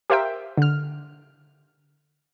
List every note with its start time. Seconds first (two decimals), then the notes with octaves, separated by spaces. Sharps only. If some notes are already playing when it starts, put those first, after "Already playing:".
0.10 G4 A#4 C5 E5 F5 G5
0.58 D3 F6